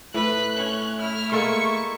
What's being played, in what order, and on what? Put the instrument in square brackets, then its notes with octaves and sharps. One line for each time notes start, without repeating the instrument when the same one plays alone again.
[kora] A2 [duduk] A3 [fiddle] B4 [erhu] F#6
[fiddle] C#4
[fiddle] E4 [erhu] F6
[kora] G#3 A#3 A4 [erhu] C#6